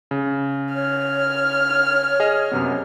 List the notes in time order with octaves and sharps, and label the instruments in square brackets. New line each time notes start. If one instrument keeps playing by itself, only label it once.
[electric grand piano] C#3
[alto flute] C#5 [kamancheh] F6
[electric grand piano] G#4 D#5
F#2 C3 B3